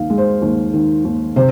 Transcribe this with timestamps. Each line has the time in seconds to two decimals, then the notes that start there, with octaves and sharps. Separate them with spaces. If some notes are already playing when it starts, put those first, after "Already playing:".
Already playing: D#2 D#3 F5
0.10 G#3
0.18 C5
0.42 D#2
0.73 D#3
1.04 D#2
1.36 C3 C5